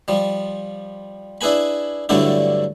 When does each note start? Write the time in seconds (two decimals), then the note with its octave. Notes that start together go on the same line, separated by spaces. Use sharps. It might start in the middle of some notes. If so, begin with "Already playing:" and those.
0.08 F3 G3
1.41 D4 E4 G#4 B4 G#5 B5
2.09 G2 D3 F#3 A3 D4 E4